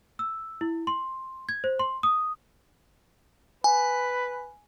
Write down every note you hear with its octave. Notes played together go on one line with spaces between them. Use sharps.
E6
E4
C6
G#6
C5
C6
D#6
B4 G#5